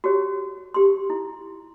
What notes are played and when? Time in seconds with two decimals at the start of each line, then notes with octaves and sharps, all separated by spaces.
0.04 F#4 G4 C#5
0.74 G4 C6
1.10 E4